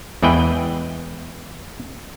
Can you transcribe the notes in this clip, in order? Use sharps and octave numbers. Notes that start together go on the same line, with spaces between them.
E2 E3 G#3 G#4 B4 G5